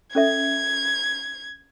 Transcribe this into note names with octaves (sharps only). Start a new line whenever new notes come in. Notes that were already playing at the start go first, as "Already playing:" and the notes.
C#4 A4 E5 G#6